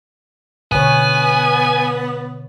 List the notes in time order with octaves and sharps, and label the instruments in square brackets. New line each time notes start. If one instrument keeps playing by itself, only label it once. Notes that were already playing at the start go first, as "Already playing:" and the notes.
[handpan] B2 D3 C#5 [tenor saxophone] B3 [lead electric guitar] G#5